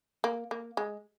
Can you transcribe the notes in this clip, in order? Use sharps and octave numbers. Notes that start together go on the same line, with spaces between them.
A#3
A#3
G#3